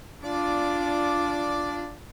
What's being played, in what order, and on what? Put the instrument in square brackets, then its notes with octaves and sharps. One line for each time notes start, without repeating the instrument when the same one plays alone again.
[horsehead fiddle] D4 F4 [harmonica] D5 D6